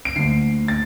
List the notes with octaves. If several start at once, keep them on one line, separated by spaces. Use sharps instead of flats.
D7
D2 D3 C7
A6